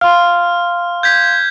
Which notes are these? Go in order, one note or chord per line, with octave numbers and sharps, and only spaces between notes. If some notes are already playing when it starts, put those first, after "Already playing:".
F5 C6 F6
G6 G#6 B6